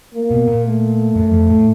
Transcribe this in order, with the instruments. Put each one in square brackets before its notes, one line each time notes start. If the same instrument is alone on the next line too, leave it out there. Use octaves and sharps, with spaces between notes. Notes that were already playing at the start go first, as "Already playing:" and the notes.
[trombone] A#3
[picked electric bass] B2
A#2
[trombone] A3
[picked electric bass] F#2
F2
A2